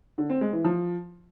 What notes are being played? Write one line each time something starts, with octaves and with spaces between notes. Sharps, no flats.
D3
C4
G#3
E3
F3